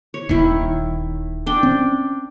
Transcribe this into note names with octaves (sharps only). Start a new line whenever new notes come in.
C#5
D#1 D#2 D#3 E4
D4 G5
C4 C#4